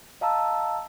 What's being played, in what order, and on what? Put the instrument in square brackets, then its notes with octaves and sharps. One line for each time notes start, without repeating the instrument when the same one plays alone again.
[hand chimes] D#5 F5 A5 A#5 E6